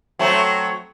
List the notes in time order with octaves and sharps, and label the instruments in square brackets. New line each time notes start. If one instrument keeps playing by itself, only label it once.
[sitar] F#3 A3 C4